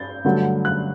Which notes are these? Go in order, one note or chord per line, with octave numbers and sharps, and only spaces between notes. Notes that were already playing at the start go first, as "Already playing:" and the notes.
Already playing: G6 A6
G2 D3 F#3 A3
F#6